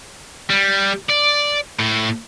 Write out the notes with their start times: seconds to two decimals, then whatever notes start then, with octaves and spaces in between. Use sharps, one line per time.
0.50 G3
1.10 D5
1.79 A2